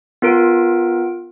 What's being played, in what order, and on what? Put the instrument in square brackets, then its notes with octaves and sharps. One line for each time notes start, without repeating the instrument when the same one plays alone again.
[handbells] B3 F4 A#4 D7